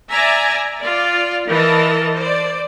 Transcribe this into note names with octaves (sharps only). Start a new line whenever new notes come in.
D5 E5 G#5 A#5
F4 D5
E3 A#4 D#5 A5
C5 D5